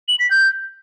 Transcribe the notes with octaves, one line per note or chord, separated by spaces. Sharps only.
F#7
B6
G6